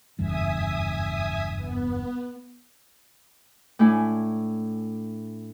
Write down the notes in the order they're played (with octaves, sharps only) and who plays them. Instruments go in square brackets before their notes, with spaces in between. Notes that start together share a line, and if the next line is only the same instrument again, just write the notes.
[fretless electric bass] F#1 E2 G2 [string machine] E5 G#5 D#6
[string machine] B3
[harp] A2 A3 D4 E4 G#5